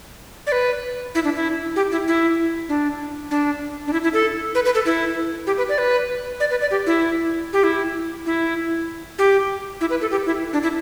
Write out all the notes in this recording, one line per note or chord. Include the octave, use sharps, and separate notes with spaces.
D5
B4
E4
D4
E4
G4
E4
E4
D4
D4
D4
E4
E4
A4
B4
B4
A4
E4
G4
B4
D5
B4
D5
B4
D5
G4
E4
G4
E4
E4
G4
E4
B4
A4
G4
E4
D4
E4